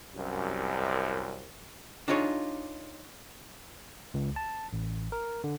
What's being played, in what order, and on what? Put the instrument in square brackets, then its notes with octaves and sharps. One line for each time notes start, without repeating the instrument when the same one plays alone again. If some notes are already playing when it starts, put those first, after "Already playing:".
[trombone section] C2 F#2
[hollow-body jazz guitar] D4 D#4 F4 G#4 C#5
[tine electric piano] C#2
A5
A1
A#4
D3